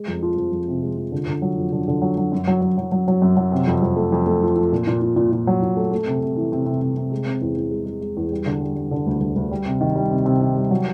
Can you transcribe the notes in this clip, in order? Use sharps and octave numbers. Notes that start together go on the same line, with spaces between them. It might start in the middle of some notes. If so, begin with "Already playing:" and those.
Already playing: G#3
F2
F3
F2
F2
C3
G#3
F3
D3
D3
F#3
F2
D3
D3
F#3
F#3
F#2
F#3
F#3
F#3
F#3
F#3
F#2
F#3
C3
F2
F2
A3
F2
A3
F3
F3
A#2
A#2
A#2
A#2
A#2
F#3
A#2
A3
A3
C3
C3
E3
C3
C3
C3
C3
G#3
C4
E2
E2
G#3
G#3
G#3
E2
G3
D3
G3
G3
D3
D2
D2
D2
G3
C3
D#3
G3
C3
C3
D#3
G3
F#3